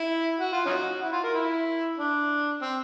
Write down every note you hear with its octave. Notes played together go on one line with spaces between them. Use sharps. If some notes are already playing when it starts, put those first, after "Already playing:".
Already playing: E4
F#4
F4
C#4 D#4 F#4
E4
F4
A#4
E4
D4
C4